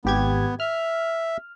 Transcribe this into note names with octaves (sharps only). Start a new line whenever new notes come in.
G#1 B3 G4 G#6
E5 F6